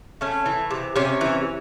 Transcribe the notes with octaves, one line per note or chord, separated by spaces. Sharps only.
A3 C#4
E3
C3
C3 C#4
E3